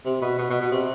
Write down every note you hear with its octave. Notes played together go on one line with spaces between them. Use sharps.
C3
B2
B2
B2
B2
C3